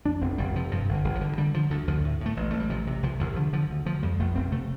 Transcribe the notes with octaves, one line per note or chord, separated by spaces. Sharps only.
F2 D4
F1 C4
F1 G3
C3 F3
G2 F3
G1
D3
G1
F3
D3
D3 G3
D3 F3
D2 D3
D2 F3
A2
A2
A3
A1
A1 A3
G3
C3 F3
C3
C2 F3
C2 F3
D3 F3
D3 F3
D2
D2 F3
F2 G3
F1 A3
F1 C4
C3 A3